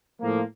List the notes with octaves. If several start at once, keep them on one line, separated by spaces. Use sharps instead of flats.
A2 F3 A#3